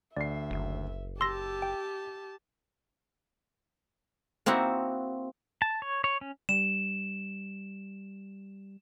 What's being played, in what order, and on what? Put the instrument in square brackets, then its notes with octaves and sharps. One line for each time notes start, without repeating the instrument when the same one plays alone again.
[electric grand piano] D2 C7 [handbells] D5 [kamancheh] E5
[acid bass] F#1
[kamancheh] G4 A5 [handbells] C6 A#6 [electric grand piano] E6
[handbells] G5
[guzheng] A#3 C4 D#4 E4 F#4
[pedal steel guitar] A5
C#5
C#5
C#4
[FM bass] G3 [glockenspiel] E7